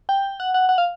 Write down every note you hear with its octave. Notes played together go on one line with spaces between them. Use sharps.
G5
F#5
F#5
F#5
F5